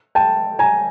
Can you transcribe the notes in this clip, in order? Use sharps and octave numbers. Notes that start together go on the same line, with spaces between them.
G5 A5
G#5 A#5